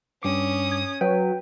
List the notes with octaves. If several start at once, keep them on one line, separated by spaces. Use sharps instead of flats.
G2 C#4 D6 D#6
G#6
F#3 B4 G5